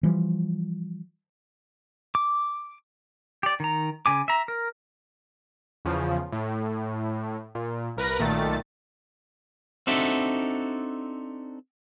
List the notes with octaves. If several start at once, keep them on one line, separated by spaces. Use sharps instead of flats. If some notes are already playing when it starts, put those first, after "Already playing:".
E3 F3 G3
D6
G4 D5
D#3 A#5
C#3 G#5 D6
E5 A#5
A#4
E2 C#3 F3
A2
A#2
C2 A#4 B4 A#6
B1 A#2 D#3 A3 A6
C4 D4 D#4 F#4 A4 E5